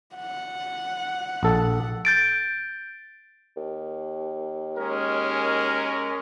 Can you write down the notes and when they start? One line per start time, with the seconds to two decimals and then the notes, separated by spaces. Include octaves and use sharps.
0.16 F#5
1.43 A#1 A4
2.05 G6 A6 D7
3.56 D#2
4.77 G#3 C#4 A#4